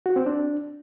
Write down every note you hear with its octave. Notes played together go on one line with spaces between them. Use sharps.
F#4
C4
D4